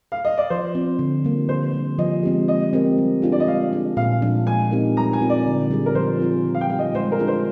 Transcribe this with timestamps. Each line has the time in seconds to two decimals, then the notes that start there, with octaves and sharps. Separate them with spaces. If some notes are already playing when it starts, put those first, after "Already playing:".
0.12 F5
0.25 D#5
0.38 D5
0.50 F3 C5
0.75 C4 F4
0.99 D3
1.24 G3 A#3
1.49 D3 C5
1.73 G3 D4
1.98 F3 D#5
2.23 G#3 C4 G4
2.48 G#3 D#5
2.73 C4 G4 A#4
2.98 G3
3.22 D4 F4 G#4
3.32 D5
3.40 D#5
3.47 G#3 F5
3.73 D4 G#4
3.97 A#2 F5
4.22 F3 G#3 D4
4.47 G#3 G#5
4.71 C4 D#4 G4 A#4
4.97 G3 A#5
5.13 G#5
5.22 C4 F4 A#4
5.30 D5
5.46 D3
5.71 G3 D4 G#4
5.86 A#4
5.95 F3 C5
6.20 C4 F4 G#4
6.45 D#3
6.55 F5
6.61 G5
6.70 G3 C4 D#4 G4
6.79 D#5
6.95 G#3 C5
7.12 A#4
7.19 D4 F4 G#4
7.28 C5